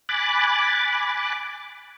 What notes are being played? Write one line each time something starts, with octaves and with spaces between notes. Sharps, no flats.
G#5 B5 D6 F#6 A6